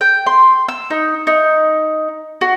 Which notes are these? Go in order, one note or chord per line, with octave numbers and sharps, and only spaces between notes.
G5
C6
E6
D#4
D#4
F#4